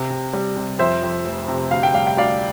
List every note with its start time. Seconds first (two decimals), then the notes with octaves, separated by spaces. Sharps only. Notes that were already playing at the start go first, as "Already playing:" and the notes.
Already playing: C3
0.10 C3
0.33 G3
0.57 C3
0.79 F2 C5 E5
1.03 F2
1.25 F1
1.48 C3
1.71 D2 F5
1.83 G5
1.94 G3 F5
2.07 G5
2.17 D2 D5 F5